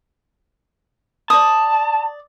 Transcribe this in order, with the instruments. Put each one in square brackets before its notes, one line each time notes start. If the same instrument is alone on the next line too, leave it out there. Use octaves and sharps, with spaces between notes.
[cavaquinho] D5 D#6 [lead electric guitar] A5